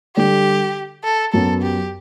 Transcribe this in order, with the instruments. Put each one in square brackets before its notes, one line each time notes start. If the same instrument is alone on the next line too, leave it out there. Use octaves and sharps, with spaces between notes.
[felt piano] D3 G3 D4 A4 [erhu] G4
[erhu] A4
[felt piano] F#2 F#3 B3 [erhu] A4
[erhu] G4